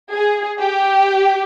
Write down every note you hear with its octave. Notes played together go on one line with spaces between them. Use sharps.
G#4
G4